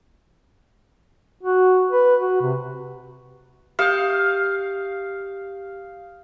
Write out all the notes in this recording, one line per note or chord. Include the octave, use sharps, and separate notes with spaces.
F#4
B4
F#4
C3
G4 F5 D#6 G6